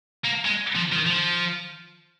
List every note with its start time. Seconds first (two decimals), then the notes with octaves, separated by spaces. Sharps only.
0.24 A#3
0.45 G#3
0.75 F3
0.92 F3
0.96 D#3
1.06 F3